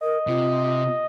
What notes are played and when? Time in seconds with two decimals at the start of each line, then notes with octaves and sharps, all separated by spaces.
0.01 A#4 D#5
0.27 C3 F4